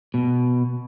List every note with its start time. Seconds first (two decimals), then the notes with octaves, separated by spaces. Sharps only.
0.14 B2